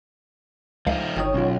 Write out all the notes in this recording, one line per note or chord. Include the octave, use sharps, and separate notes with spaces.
C#2 F3 D#4 F5
G1 D#3 C#5 G5 D#6
B1 C#4 F4